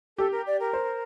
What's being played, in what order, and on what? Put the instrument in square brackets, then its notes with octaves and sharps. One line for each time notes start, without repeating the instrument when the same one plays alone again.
[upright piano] G4 [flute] A4
[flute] A#4
D5
A#4
[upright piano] C5